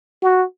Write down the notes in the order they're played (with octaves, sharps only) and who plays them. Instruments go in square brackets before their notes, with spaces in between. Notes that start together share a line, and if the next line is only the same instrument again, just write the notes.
[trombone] F#4